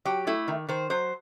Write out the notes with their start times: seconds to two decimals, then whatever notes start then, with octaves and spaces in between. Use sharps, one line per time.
0.05 F#3 G4
0.27 A3 E4
0.48 D#3
0.69 D#3 C5
0.90 F#3 C5